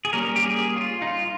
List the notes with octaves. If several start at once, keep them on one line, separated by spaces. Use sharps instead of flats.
G#4
G3 A#3 C#4 A#4
G4
G#4
F4
D#4
F4